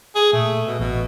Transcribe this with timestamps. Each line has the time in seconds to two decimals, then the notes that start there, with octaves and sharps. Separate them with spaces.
0.15 G#4
0.33 A#2 A3
0.67 B2
0.80 A1 B2